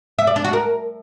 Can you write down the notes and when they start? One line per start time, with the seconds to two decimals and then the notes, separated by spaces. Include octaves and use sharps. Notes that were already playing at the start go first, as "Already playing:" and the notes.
0.19 E5
0.27 D5
0.36 D4
0.44 F#4
0.53 A#4